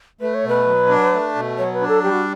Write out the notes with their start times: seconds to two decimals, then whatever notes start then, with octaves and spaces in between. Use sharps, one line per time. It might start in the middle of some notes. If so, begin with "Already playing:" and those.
0.21 A3 B4
0.34 C#5
0.44 B2 B4
0.66 F#3
0.89 D4
1.12 A3
1.35 B2
1.58 F#3 C#5
1.74 B4
1.81 D4
1.88 A4
2.04 G3 G4
2.12 F#4